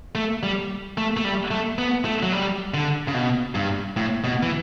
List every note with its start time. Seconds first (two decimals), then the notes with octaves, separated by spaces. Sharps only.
0.15 A3
0.43 G3
0.98 A3
1.17 A3
1.25 G3
1.51 A3
1.79 B3
2.05 A3
2.23 F#3
2.32 G3
2.74 D3
3.08 C#3
3.14 B2
3.55 G2
3.97 A2
4.24 B2
4.43 E3